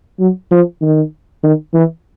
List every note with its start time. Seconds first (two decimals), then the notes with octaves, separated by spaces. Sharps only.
0.20 F#3
0.51 F3
0.82 D#3
1.43 D#3
1.74 E3